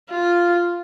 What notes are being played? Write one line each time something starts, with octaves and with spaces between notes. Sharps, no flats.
F4